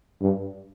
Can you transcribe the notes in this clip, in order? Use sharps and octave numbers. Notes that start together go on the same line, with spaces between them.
G2